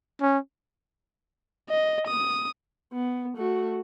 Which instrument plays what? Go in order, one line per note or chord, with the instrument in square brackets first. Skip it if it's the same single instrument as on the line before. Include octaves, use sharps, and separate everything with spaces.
[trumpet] C#4
[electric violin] D#5
D#6
[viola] B3
A3 F#4